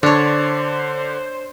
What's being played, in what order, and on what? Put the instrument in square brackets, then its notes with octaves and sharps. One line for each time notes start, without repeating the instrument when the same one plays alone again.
[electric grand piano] D3 [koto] D4 C#5 [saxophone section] C5